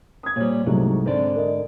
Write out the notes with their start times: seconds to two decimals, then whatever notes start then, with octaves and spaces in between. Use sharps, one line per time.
0.23 D#6 G#6
0.36 A#2 G3 C5 C#5
0.66 C2 G#2 F#3 A3
1.06 G#2 D3 C4 D5
1.36 A#4 D#5